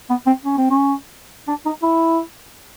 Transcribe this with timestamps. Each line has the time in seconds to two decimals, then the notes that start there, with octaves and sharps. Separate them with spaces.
0.10 B3
0.27 C4
0.44 C#4
0.58 C4
0.71 C#4
1.48 D4
1.66 D#4
1.83 E4